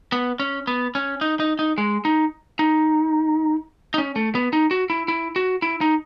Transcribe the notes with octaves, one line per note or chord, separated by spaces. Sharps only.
B3
C#4
B3
C#4
D#4
D#4
D#4
G#3
D#4
D#4
D#4
C#4
A3
B3
D#4
F#4
E4
E4
F#4
E4
D#4